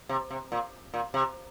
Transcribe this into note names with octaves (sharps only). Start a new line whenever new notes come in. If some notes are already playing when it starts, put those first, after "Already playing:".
C3
C3
A#2
A#2
C3